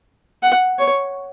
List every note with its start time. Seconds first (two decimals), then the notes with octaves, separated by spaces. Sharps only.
0.43 F#5
0.79 C#5